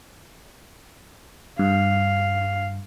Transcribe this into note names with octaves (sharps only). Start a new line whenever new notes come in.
G2 F5